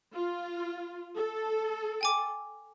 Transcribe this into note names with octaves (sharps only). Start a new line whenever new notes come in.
F4
A4
G5 G#5 D6